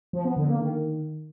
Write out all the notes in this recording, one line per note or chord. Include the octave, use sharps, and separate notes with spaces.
F3
B3
D3
A#3
D#3